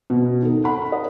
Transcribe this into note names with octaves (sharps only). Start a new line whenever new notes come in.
B2
D#4 A4
F#5 B5
D#5